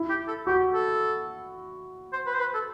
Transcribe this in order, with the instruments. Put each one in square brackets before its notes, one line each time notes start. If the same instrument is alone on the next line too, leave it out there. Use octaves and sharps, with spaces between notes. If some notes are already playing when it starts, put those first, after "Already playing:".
Already playing: [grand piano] E4
[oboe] G4
A4
[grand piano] F#4 [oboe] G4
[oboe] A4
C5
B4
C5
B4
A4